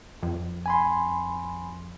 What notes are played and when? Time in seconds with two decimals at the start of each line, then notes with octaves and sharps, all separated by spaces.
0.23 F2
0.66 G#5 B5 C6